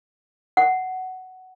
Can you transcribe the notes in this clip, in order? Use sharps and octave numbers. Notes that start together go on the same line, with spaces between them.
F#5